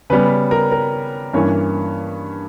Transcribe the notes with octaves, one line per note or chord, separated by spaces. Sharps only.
C#3 G3 B3 B4
A#4
A#4
G2 E3 A#3 C#4 C#5